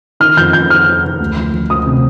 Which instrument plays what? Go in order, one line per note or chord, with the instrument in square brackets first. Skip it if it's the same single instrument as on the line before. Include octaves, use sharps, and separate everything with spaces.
[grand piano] D#3 F6
F2 G6
F2 G6
D#3 F6
D#3
D#3
D2
F3
F3
D2 D#6
C3